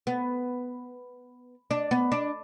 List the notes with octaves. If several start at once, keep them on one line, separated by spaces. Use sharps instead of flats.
B3
D4
B3
D4